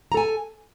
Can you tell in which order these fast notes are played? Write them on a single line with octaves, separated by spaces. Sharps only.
A#5 A4 G#5